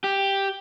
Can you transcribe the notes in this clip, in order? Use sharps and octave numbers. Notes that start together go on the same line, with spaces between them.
G4